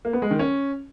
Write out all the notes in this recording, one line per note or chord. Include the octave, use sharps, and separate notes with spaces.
A#3
B3
G#3
D#3
C#4